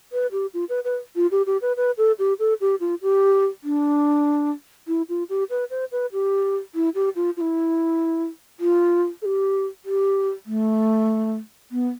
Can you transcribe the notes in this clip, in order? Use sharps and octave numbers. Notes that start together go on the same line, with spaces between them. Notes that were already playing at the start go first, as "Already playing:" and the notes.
B4
G4
F4
B4
B4
F4
G4
G4
B4
B4
A4
G4
A4
G4
F4
G4
D4
E4
F4
G4
B4
C5
B4
G4
E4
G4
F4
F4
E4
F4
A4
G4
G4
A3
B3